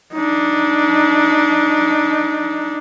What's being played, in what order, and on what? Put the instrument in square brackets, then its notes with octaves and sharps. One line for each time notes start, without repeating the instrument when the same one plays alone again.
[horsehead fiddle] D4 D#4